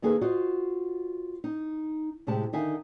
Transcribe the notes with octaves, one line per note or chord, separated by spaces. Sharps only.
D#3 A#3 D#4 G#4 A4 B4
F4 F#4 C5 D#5
D#4
A2 C3 G#3 G4 A5
D3 D#3 D#4 E5 F5 G#5